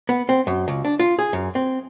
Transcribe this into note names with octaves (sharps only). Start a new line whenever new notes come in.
B3
C4
F#2
C#2
D4
F4
G#4
F#2
C4